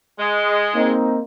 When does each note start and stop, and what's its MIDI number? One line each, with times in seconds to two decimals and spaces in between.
0.19 0.91 56
0.75 1.20 58
0.75 1.20 60
0.75 1.20 63